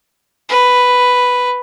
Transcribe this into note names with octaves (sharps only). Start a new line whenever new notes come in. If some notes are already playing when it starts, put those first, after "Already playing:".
B4